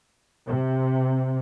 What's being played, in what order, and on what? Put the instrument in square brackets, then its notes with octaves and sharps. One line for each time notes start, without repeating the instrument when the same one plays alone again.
[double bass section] C3